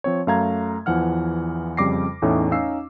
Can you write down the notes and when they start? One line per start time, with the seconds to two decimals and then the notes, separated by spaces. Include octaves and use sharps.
0.04 F3 C4 C#5
0.27 F#2 A3 F5 A#5 G#6
0.86 E2 E3 F3 F#5 F6
1.77 F2 C#3 G3 D6 A#6 C7
2.22 E2 A2 A3 C#4 D#4
2.51 C#4 D#4 F5 E6 C7